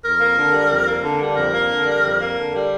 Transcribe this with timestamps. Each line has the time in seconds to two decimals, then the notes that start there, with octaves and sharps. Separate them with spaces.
0.03 F2 A#4
0.20 A#3
0.37 D3
0.53 G3
0.70 F2
0.87 A#3
1.03 D3
1.20 G3
1.36 F2 A#4
1.54 A#3
1.70 D3
1.86 G3
2.03 F2
2.21 A#3
2.36 D3
2.54 G3